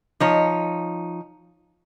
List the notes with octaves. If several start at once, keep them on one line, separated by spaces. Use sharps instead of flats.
F3 D#4 C#5